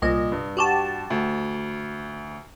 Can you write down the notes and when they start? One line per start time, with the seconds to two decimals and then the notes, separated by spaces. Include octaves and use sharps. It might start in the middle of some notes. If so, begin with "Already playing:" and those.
0.02 C2 A#2 D#5
0.32 G2
0.57 F#4 G4 A5
1.10 D2